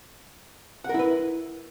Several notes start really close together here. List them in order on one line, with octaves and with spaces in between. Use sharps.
F#5 A#4 E4 B4